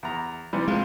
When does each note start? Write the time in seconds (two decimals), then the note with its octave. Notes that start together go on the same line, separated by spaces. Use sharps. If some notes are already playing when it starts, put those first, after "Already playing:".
0.03 E2 A#5
0.53 C3 E3 G3
0.68 C3 G#3 F4